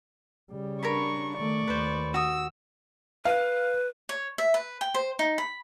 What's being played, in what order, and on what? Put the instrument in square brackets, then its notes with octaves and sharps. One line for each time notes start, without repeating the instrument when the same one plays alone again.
[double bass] C#3 G3
[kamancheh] D4 C#6 [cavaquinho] A#4 C#5 B5
[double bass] D#3 A3 [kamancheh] D5 C#6
[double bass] D#2 [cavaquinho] B4 C5
[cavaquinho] F#4 D#6 [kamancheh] E6
[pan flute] B4 [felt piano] F5
[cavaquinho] C#5
E5
B4
G5
C5
D#4
B5